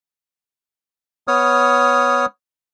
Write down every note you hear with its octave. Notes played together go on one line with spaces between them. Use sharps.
B3 C#5 D#6 F6